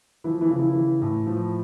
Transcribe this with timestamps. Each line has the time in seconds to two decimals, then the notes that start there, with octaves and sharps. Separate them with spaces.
0.24 E3 F3 E4
0.41 E3 E4
0.50 C#3
0.59 E3 E4
0.75 E3
1.02 A2
1.27 F3